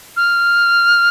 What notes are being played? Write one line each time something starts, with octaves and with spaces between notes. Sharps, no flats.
F6